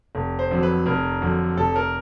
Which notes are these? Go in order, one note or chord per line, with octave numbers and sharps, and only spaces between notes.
F1
C5
F2 D3 F#3
B4
F1 A#4
F2 D3 F#3
F1 A4
A#4